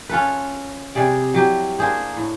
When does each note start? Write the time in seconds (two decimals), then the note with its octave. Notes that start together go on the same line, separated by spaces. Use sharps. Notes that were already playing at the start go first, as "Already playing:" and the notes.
0.09 C#4 F4 A4 B4
0.95 C3 G3 G#4 D5
1.34 F#3 E4 G4
1.79 A#3 D4 G#4 C5
2.16 A2